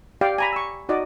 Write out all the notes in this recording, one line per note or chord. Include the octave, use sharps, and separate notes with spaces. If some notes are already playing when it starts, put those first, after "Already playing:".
G4 D5 F5 G5
G#5 A#5 B5
C#6 E6
D#4 F#4 D5 D#5